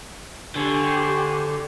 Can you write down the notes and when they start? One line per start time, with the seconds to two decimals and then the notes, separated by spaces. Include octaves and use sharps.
0.56 D3 G4 C5 G#5 C#6